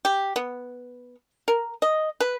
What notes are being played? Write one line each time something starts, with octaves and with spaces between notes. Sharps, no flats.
G4
B3
A#4
D#5
B4